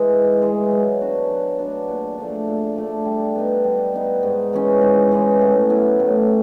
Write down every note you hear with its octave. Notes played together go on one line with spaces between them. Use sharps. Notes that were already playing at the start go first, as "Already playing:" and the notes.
Already playing: E3 G#3
G#2
E3 G#3
F#3
B3 D4 F#4
F#3
B3 D4 F#4
A#2
F3 A3 D4
A#2
F3 A3 D4
G3
B3 D#4
G3
B3 D#4
G#2
E3 G#3 C#4
G#2
E3 G#3 C#4
A2
F#3 B3 E4
A2